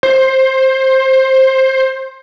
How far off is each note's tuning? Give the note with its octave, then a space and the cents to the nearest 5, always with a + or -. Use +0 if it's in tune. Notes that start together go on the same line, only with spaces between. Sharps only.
C5 +15